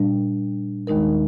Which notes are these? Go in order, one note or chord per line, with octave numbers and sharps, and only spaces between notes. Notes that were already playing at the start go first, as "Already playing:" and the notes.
Already playing: A#2 G3 D4
D#2 D#3 G#3 D#4 A#4